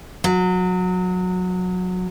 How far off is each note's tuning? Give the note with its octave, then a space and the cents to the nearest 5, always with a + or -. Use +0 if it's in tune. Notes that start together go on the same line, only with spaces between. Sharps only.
F#3 -20